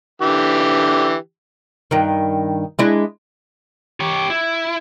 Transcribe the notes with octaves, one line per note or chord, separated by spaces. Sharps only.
D3 E3 G4
G2 D#3
G#3 D4 E4
G4 C#5
E4